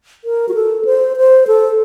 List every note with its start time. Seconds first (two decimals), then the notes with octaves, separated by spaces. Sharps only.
0.24 A#4
0.49 F#4
0.54 A4
0.85 C5
1.17 C5
1.47 A4